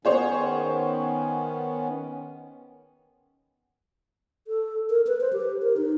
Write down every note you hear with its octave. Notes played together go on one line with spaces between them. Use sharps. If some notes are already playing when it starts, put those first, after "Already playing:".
D#3 B3 C#4 G#4 C5 C#5
A4
A#4
B4
C5
G4
A#4
D#4